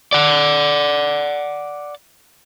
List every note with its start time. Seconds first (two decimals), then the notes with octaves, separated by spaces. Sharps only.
0.13 D5 F#5